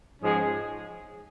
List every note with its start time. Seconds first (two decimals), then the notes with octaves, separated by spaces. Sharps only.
0.22 G#2 F3 G#3 C#4 G#4